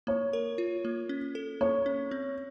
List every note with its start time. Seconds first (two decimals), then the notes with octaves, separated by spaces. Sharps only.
0.07 A#3 C#5
0.33 A#4
0.58 F4
0.85 A#3
1.09 C#4
1.35 A4
1.61 A#3 C#5
1.86 C#4
2.11 C4